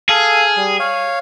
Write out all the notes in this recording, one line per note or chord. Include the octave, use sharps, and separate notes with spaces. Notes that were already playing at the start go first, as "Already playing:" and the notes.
G#4 A4 F5
G3
C#5 F5